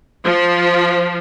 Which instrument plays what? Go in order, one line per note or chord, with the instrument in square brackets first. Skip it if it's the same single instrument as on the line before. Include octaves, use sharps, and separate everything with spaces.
[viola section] F3